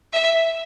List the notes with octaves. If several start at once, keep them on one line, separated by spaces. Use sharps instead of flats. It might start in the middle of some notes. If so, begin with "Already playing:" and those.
E5